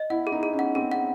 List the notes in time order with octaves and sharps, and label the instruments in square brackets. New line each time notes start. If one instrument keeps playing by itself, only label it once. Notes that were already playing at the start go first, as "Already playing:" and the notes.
Already playing: [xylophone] D#5
[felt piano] E4 [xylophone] F#5
[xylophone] G#4
[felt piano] D#4
[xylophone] G#4
[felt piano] C#4
[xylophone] F#5
[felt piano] C4 [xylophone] G#4
[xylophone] F#5